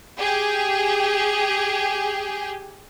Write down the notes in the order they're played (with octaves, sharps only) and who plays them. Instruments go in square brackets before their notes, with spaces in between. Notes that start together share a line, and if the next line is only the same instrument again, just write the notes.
[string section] G4 G#4